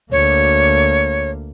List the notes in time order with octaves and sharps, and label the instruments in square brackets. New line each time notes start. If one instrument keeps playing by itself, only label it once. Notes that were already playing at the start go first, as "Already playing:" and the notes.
[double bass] D2 A#3 [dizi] C#5